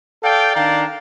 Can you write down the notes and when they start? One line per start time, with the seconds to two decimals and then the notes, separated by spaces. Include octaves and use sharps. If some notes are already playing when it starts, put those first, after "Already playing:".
0.24 A4 D5 F5 G5
0.56 D#3 D4 D5 F5 G5 A#5